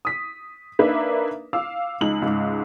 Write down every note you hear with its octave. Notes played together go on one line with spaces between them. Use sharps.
D#6 B6
A#3 D4 D#4 B4 E5
F5 D6 E6
C#2 D#4 F#7
C#2 G#2